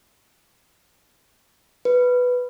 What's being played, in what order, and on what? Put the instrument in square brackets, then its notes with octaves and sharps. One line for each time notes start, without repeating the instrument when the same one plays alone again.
[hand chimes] B4